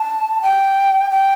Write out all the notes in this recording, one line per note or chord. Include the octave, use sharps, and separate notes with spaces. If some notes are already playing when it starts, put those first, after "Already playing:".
Already playing: A5
G5
G5